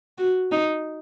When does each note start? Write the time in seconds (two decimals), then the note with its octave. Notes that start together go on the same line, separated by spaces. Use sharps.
0.18 F#4
0.52 D#4